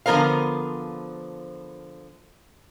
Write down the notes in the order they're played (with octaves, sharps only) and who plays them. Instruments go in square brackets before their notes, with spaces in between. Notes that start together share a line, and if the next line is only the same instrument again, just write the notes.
[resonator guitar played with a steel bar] D3 F3 B3 A#4 C5 F5